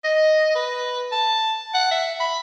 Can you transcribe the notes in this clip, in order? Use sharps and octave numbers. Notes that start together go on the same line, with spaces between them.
D#5
B4
A5
F#5
E5
B5